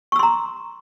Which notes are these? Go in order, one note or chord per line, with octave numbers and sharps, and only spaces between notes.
A#5 C6 C#6 E6